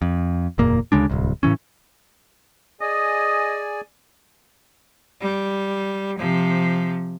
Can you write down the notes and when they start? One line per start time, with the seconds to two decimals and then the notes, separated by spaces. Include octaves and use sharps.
0.02 F2
0.58 F#1 E2 A#2 A#3
0.92 D2 C#3 G#3 D4
1.10 D1 C2
1.43 A2 C#3 E3 C#4
2.81 G#4 D5 D#5 G#5
5.21 G3
6.18 C3 F3